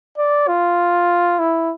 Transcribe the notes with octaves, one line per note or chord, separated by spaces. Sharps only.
D5
F4
E4